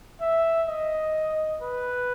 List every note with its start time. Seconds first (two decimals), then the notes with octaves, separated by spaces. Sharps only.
0.21 E5
0.68 D#5
1.61 B4